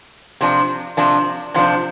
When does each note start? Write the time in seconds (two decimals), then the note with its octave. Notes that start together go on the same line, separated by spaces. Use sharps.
0.41 C3 F3 D4
0.97 C3 F3 D4
1.54 C3 F3 D4